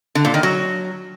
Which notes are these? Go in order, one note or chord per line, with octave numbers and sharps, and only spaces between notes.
D3
A#2
D#3
F#3